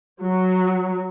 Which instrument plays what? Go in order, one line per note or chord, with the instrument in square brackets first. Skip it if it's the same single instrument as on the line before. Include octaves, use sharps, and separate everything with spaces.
[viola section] F#3